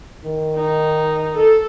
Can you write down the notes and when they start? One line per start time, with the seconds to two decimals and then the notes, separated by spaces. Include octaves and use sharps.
0.24 D#3
0.55 D#4
1.37 A4